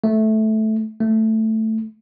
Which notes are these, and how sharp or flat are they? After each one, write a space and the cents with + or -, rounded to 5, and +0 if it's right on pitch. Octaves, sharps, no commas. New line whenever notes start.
A3 -10
A3 +5